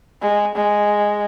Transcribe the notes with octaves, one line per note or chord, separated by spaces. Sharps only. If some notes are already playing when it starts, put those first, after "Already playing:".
G#3
G#3